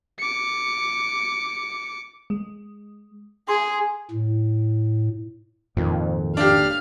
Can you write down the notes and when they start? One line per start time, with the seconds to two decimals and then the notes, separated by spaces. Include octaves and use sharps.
0.19 D6 C#7
2.30 G#3
3.48 G#4 C6
4.11 A2
5.77 G#1 F2 A#2 D#3
6.37 D4 G4 F5 F6